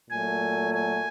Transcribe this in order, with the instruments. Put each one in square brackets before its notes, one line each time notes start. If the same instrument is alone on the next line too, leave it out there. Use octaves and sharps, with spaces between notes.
[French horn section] A#2 F#3 A3 [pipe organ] G#5
[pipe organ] G#5